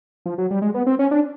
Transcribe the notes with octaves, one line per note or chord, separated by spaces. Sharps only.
F3
F#3
G3
G#3
B3
C4
C#4
D4